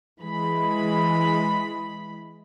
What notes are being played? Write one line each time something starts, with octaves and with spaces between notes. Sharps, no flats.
E3 G#3 B5